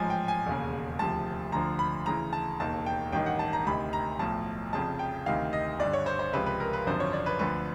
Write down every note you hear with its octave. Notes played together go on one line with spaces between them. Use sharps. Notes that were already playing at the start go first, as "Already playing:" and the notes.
Already playing: A1 G#2 F3 G#5
G5
G#5
E1 D#2 C#3
D2 C3 F3 A5
D2 D3 F3 A#5
B5
D2 C#3 E3 A#5
A5
E1 D#2 D#3 A5
G5
A1 G2 D#3 G5
F#5
A5
A#5
D2 C3 D#3 B5
A#5
B1 A2 F3 A5
F1 F2 C#3 F3 A5
G5
D2 C3 D#3 F5
D#5
G1 G2 D3 D5
C#5
C5
C5
C#2 C3 F3 B4
B4
A#4
B4
G#1 F#2 D3 F3 C5
C#5
D5
B4
D2 D3 F3 B4